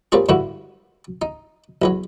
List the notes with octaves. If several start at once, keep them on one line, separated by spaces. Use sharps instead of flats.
G3 A#3 C4 C#4 F4 G#4
G2 D3 G3 E4 F#4
D#4
B1 E2 F#3